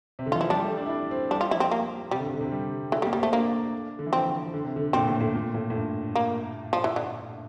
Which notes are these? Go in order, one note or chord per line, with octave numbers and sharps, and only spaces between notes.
C3
D3
E3 F4
F3 E4
G3 D4
A3
D4
E4
D4
C4
G3 D4
F4
F3 E4
C4
A#3
C3 G3
D3
C3
D3
C3
G3
E3 A3
G3
A#3
G3
A3 C4
A#3 D4
D3
E3
F3 C4
D3
C3
D3
A#2 C4
A2
A2
A#2
A2
A2
G2
A#3
F3
E3
D3